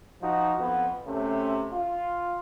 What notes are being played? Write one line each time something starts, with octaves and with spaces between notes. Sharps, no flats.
F3 D#4 F#4
F2 B3
C3 A3 C#4
F4